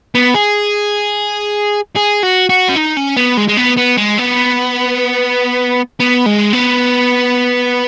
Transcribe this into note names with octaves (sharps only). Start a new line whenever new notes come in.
B3
G#4
G#4
F#4
F#4
C#4
D#4
C#4
B3
G#3
G#3
B3
B3
G#3
B3
B3
G#3
B3